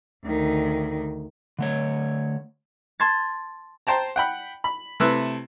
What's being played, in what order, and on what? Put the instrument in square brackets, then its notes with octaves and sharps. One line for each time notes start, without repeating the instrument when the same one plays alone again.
[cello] D2 D#3
[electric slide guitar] D3 A3 C#5
[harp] A5 C6 G#6 A6
[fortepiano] C5 G5 A5 A#5
F#5 G5 B5
B5
C3 A3 E4 B4 E6 F#6